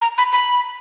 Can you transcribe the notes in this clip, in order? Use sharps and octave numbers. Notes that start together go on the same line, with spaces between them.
A#5
B5
B5